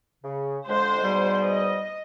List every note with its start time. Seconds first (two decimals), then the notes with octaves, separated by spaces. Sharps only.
0.23 C#3
0.68 F2 D3 G#3 C5
1.03 G#2 B2 G3
1.43 D#5